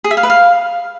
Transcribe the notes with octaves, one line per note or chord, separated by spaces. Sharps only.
G#4
E5
F5
B4
F5